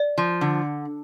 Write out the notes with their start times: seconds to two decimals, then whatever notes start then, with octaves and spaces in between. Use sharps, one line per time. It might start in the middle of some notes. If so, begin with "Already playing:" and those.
Already playing: D5
0.18 F3
0.41 D3